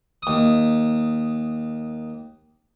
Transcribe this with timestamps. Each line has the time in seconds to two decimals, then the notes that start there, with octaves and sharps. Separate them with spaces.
0.23 D#2 D#6